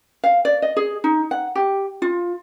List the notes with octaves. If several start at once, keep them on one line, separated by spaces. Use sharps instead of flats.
F5
D5
D#5
G#4
D#4
F#5
G4
F4